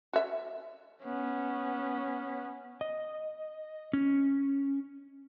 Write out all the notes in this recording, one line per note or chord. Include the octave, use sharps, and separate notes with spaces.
F#4 E5
B3 C#4
D#5
C#4